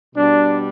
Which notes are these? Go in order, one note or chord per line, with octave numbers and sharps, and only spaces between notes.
B2 G3 D4